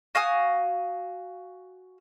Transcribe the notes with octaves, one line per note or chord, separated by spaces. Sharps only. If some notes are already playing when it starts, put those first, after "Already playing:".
F#4 F5 G#5 D#6